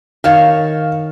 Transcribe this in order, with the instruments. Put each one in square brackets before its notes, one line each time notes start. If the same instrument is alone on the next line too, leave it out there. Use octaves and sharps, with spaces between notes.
[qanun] D#3 C#5 A5 [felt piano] F5